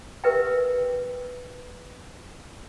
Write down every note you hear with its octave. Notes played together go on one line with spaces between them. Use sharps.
G4 A#4 B4 E5 G5